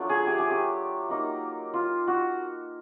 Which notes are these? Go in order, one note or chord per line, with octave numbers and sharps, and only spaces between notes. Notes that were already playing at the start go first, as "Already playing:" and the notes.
Already playing: F#3 A3 D4 F4
G#4
G4
G#4
G4
A#3 D#4
F4
F#4